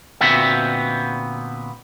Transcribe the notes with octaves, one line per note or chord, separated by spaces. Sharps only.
A#2 D3 B3 C4 F#4 E5